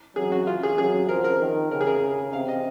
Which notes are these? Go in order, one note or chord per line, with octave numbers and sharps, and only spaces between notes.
F#3 G#4
F#4
F4
G#4
F#3 G#4
F3 A#4
A#4
D#3
C#3 A#4
G#4
A#4
C3 F5
D#5